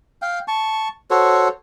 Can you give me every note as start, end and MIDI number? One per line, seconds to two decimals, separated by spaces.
0.22 0.39 77
0.22 0.39 79
0.48 0.88 81
0.48 0.88 85
1.11 1.48 66
1.11 1.48 69
1.11 1.48 72
1.11 1.48 73